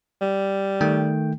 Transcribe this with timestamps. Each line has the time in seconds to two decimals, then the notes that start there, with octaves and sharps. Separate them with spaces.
0.21 G3
0.81 D#3 A3 G5